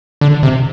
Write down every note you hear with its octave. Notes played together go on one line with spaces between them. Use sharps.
D3
C3